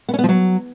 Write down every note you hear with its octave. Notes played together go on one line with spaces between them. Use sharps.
B3
C#4
B3
F3
F#3